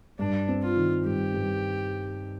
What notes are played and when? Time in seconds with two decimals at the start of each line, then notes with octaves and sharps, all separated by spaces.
0.19 G2 D4
0.49 C4
0.62 F4
0.76 D#3
1.05 G2 G4
1.34 G2